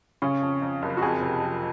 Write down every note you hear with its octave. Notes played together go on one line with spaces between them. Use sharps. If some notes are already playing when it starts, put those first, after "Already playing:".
C#3 C#4
F2
F2
F#1
F#4
F2 G#4
C3
F3